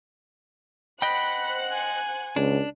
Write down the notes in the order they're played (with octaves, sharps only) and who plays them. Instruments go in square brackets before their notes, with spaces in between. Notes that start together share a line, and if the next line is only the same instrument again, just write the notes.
[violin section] C5 F#5 F#6 [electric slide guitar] D#5 G5 [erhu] B5
[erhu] G#5
[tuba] C#2 [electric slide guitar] D4